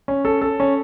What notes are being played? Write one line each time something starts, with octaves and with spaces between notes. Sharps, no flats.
C#4
A4
A4
C#4